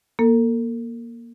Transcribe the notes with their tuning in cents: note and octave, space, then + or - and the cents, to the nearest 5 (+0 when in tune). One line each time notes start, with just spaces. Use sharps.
A#3 +15 A4 +45